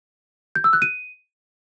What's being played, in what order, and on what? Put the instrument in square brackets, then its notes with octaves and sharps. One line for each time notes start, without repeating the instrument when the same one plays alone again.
[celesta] G6
E6
F#6
D#7